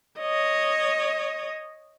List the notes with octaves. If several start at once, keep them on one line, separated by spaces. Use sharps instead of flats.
C#5 D#5